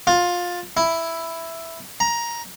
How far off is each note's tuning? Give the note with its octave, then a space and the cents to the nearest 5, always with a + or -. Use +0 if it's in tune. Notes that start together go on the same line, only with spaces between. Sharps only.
F4 +20
E4 +5
A#5 +10